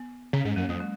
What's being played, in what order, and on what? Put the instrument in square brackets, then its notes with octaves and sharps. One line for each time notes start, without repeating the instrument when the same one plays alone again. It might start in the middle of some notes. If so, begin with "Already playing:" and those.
Already playing: [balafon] B3
[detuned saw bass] C#3 [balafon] C#4
[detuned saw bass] G#2
[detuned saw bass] F#2 [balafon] A#3
[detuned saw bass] F2 [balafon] F#3
[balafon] G#3